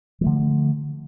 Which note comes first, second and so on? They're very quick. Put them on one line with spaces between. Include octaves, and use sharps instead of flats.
F3 A3 D3